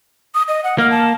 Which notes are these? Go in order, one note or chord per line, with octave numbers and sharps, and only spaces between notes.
D#6
D#5
F#5
A#3 F6
A5